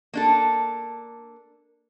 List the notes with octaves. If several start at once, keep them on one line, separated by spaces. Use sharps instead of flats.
A#3 D4 A4